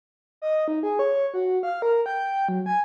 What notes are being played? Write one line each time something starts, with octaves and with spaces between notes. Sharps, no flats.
D#5
D#4
G#4
C#5
F#4
F5
A#4
G5
F#3
G#5